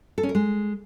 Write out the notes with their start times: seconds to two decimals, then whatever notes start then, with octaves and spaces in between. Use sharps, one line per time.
0.18 A4
0.23 C#4
0.29 A#4
0.35 G#3